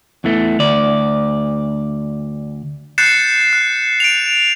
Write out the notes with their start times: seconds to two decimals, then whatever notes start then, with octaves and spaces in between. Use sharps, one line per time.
0.24 E2 E3 A3
0.59 D2 D5
2.98 F#6 G6 A6 C7 C#7 E7
3.53 F#6
4.00 D7 F7